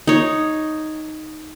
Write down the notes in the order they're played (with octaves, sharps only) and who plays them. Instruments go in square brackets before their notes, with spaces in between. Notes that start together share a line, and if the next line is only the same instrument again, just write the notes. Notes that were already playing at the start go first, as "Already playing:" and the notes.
[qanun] D#4 C#5